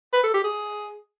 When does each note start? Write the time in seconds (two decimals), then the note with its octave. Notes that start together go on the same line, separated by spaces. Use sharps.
0.13 B4
0.24 A4
0.34 G4
0.44 G#4